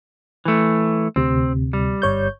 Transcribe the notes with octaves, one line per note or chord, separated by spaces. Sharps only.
E3 A3
D2 C3 C4
G3
G1 C#5 G6